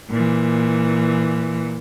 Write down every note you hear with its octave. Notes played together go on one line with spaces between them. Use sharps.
A#2 E3